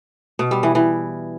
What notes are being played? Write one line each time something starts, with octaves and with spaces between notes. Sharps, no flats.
B2
G3
E3
E3